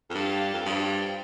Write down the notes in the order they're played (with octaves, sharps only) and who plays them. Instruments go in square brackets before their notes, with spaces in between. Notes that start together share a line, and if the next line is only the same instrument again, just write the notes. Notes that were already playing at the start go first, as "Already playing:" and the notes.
[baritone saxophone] F2
[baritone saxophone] G2 [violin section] G4 B4 F5 A5
[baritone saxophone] F2
[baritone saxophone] G2 [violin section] F4 C5 G5